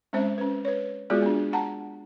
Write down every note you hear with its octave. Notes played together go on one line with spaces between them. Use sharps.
G#3 C4 C#4 C5 E5
C#4 B4
B4 C#5
G#3 B3 F4 F#4 G#4 D5
B3 D4
F#5 A5 A#5